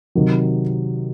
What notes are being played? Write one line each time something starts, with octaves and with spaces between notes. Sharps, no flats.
C3 D#3 F#3